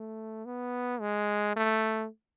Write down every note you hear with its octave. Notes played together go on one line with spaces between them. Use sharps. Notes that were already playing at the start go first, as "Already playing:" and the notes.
Already playing: A3
B3
G#3
A3